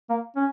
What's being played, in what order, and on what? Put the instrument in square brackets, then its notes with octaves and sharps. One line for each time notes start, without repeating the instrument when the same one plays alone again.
[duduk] A#3
C#4